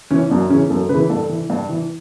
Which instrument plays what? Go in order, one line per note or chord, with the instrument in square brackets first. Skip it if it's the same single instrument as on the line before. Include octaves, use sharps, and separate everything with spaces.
[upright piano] E3 C#4
F#2 D4
C#3 E3 C#4
F#2 A4
C#3 E3 B4
G2 A4
E3
G2
E3